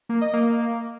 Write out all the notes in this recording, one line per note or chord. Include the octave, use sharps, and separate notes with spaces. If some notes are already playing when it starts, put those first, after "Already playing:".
A#3
D#5
A#3